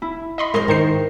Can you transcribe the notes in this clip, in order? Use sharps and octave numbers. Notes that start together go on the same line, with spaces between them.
E4
D#5 B5 C6
G#3 A#4 C5 D#5 C6
G#2 D#3 A#4 C5 C7